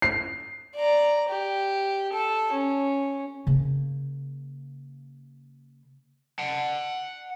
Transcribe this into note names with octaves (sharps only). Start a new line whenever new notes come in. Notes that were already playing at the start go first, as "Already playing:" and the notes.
C7
D5 A#5
G4
A4 A5
C#4
C#3 A#3
F#5 A5